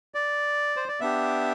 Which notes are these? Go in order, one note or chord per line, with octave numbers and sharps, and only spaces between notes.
D5
C5
D5
B3 D4 G4 E5